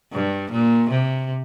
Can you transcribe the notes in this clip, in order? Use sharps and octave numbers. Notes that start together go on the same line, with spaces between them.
G2
A#2
C3